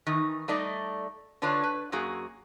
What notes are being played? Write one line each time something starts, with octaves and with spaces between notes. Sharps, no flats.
D#3 E3 D#4
G3 A3 D#4 D5 D#5
D3 D4 F4 B4 C#5
B4
F#2 A#3 F#4 G#4